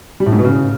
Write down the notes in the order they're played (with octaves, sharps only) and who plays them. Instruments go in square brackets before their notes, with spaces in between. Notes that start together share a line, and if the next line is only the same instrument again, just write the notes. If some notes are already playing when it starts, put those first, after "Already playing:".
[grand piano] G3
A2
G#2
B2
C#3